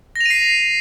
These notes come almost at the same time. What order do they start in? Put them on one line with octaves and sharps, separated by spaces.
A#6 F7 D#7 C7